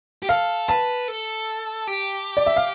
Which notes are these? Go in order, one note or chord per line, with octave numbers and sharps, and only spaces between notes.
G4
A4 F5
B4 A5
A4
G4
D5
E5
F5